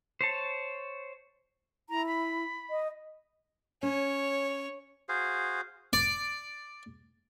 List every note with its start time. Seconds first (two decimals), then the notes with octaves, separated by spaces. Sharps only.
0.21 C5 C#5 A5
1.90 E4 A#5
2.07 B5
2.70 D#5
3.83 C#4 C#5
5.09 F#4 G#4 C5 F5
5.93 D5